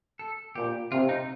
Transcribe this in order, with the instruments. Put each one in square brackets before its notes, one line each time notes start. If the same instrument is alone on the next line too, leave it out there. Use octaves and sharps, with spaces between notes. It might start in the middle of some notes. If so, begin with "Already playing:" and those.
[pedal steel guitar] A4
[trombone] A#2 [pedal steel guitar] G4
[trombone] C3 [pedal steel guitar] F4
[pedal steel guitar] D#4